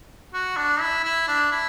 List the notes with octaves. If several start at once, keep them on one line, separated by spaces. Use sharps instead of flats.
F#4
D4
E4
E4
D4
E4